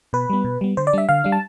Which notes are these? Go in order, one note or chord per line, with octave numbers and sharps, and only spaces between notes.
B2 B4
G3 B3
B2
G3 B3
D3 C5
D5
G3 D4 E5
D3 F5
G3 D4
A5